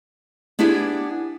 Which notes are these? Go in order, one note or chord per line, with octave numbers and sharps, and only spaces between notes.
B3 D4 E4 G4 G#4